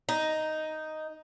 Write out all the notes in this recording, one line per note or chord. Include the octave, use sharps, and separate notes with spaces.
D#4